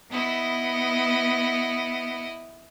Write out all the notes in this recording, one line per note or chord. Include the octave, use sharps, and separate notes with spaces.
B3 E4 D#5